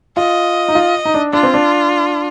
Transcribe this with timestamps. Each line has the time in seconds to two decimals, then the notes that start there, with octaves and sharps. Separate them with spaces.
0.17 F4 D#5
0.68 D#4
0.75 F4
1.05 D#4
1.14 D4
1.33 D4 F4
1.43 C4
1.54 D4